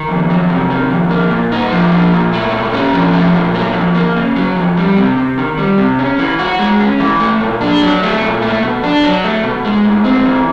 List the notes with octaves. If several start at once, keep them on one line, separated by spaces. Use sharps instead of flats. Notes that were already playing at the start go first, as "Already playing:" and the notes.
Already playing: D#3
F2
F#3
C3
D#3
F2
A#3
A#2
D#4
F3
A#3
A#2
A3
A#2
C#4
F3
A3
A#2
F#3
F2
A#3
C#3
F#3
F2
G3
C3
C3
D#3
G3
C3
C#4
E3
F#4
G#3
C#4
E3
A3
A#2
D4
F#3
A3
A#2
A3
B2
D4
F#3
A3
B2
G#3
A2
C4
E3